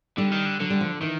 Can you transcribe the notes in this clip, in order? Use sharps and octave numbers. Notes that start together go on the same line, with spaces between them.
D3 G3
D#3
D3
D3 F#3
G3
F3
D#3 E3